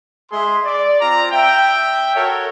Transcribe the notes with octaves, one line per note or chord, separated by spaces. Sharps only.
G#3 G#4 E5 C6
D5
C4 F4 A#5
E5 G5
F#4 A4 A#4 C#5